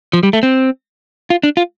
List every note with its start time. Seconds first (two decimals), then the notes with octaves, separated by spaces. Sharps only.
0.13 F3
0.23 G3
0.33 A3
0.43 C4
1.30 F4
1.43 D4
1.57 F4